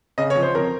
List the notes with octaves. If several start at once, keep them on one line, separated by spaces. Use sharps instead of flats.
C#3 D#5
C#5
F3
C5
F2 A#4